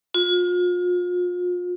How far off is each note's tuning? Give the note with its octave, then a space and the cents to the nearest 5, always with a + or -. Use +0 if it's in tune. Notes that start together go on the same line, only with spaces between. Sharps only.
F4 +35